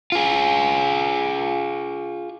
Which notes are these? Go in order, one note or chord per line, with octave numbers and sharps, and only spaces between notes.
F4 G#4